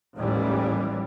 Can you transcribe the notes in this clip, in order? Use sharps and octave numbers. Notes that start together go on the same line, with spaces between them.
A1 D#2 G#2 E3 G3